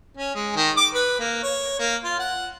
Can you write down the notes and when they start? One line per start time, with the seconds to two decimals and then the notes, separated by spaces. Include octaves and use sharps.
0.17 C#4
0.35 G#3
0.56 D#3
0.77 D6
0.94 B4
1.19 A#3
1.42 C#5
1.79 A#3
2.04 F4
2.19 F#5